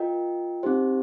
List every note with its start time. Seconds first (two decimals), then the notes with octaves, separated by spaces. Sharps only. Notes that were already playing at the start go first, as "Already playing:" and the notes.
Already playing: F4 A#4 D#5 G5
0.63 C4 D#4 G4 C5